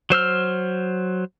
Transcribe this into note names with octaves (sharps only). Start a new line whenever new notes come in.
F#3 C5 E6 F6